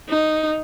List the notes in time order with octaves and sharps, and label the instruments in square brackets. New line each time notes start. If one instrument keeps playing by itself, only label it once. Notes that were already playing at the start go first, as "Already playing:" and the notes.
[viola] D#4